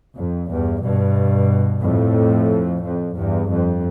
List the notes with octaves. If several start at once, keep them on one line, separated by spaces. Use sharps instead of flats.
F2
E2 G2
G2 B2
F2 A2
F2
E2 G2
F2